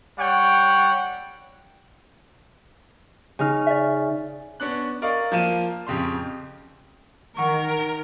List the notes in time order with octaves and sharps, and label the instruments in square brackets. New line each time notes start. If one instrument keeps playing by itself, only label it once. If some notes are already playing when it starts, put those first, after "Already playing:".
[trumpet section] G3 C#5 F#5 G5
[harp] C#3 D#4 F6
[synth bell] D5 E5
[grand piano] B3 C#4 D4 F#6
A#4 D5 D#5 F5 C#6
F3 A#3 F4 D#7 E7
F2 C#3 G4 C6
[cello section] D#3 [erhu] A#4 [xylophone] F#5 C#6